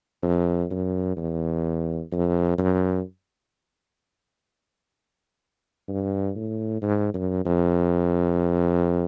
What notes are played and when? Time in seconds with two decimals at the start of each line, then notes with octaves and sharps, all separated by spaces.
0.22 F2
0.71 F#2
1.17 E2
2.12 F2
2.58 F#2
5.88 G2
6.36 A2
6.82 G#2
7.14 F#2
7.45 F2